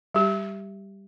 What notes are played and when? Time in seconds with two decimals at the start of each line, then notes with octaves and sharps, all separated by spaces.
0.14 G3 G4